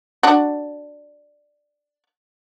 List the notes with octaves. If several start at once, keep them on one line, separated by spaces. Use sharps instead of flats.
D4 F#4